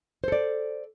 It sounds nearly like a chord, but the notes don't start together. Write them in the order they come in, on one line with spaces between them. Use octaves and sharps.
C5 A4 D5